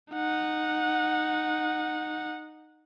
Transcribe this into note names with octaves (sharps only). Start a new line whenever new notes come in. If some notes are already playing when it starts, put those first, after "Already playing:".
D#4 F#5